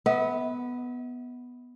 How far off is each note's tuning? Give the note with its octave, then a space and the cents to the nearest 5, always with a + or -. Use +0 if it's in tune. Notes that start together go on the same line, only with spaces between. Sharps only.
B3 +0 E5 -40